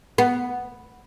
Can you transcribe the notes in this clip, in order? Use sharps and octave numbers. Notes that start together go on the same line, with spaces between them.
B3